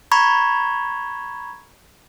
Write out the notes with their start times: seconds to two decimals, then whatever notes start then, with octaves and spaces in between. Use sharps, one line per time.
0.12 A#5 B5 C#6 G#6